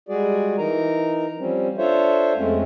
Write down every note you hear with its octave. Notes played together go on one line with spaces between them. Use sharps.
G3 G#3 F#4 G#4 D5
E3 D#4 A#4 A#5
F3 G3 C4 C#4
D4 F4 A4 C5 C#5 E5
F2 G#3 A3 C4 C#4